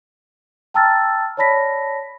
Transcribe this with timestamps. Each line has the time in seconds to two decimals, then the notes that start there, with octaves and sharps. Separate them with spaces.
0.74 G5 A5 A#5 E6 F6 A6
1.37 C#5 D5 A5 B5 A#6 B6